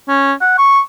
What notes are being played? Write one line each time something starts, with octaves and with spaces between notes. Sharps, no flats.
C#4
F#5
C#6